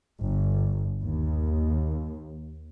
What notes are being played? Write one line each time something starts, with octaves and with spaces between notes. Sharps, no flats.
G1
D#2